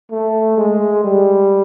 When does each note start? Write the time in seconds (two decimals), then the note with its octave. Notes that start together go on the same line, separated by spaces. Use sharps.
0.11 A3
0.58 G#3
1.04 G3